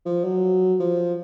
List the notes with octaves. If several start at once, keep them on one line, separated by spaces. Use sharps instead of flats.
F3
F#3
F3